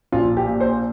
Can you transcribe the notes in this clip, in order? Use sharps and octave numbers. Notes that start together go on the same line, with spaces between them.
A#1 F4
G4
A#2
C5